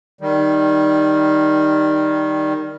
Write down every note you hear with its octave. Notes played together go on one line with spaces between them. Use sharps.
D#3 G3